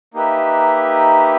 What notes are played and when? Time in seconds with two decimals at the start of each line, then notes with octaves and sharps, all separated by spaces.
0.14 A#3 D#4 G4 B4 E5